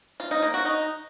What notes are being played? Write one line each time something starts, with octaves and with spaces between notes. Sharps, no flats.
F4
D#4
A#3
F#4
D#4